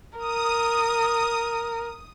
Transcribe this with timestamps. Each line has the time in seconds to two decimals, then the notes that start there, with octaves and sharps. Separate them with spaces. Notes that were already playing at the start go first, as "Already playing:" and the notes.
0.18 A#4 D#6